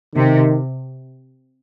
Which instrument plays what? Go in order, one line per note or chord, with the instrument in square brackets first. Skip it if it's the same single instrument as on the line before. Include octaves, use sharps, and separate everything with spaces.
[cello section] C3 [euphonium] D#3